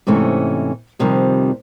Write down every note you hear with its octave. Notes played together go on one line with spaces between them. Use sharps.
G#2 C3 E3 A3 C#4
F2 C3 D#3 F3 G3